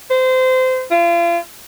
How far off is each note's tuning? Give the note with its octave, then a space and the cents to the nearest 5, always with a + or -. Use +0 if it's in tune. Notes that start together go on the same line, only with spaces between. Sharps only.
C5 -25
F4 -40